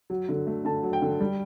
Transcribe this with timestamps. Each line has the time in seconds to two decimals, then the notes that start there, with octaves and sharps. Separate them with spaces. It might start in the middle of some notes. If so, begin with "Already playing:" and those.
0.10 F#3
0.29 D3
0.47 A3
0.65 D3 A5
0.83 F#3
0.93 G5
1.02 D3
1.21 G3